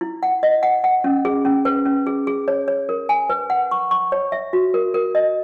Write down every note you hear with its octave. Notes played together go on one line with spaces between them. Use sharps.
E4
F#5
D#5
F#5
F#5
C#4
G#4
C#4
B4
C#4
G#4
G#4
C#5
C#5
A#4
G#5
B4
F#5
C#6
C#6
C#5
E5
F#4
A#4
A#4
D#5